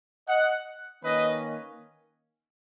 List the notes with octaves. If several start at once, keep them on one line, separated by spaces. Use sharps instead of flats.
D#5 F#5
D#3 A#3 C#4 B4 D#5